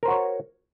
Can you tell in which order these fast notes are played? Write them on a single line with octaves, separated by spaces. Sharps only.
A#4 C5 F#4 C#5